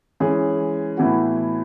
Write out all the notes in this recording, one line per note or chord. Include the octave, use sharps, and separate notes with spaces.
E3 G#3 C#4 G#4
A2 E3 B3 F#4